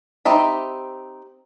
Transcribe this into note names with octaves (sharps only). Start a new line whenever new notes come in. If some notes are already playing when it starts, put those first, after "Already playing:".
C4 D#4 G4 E5 B5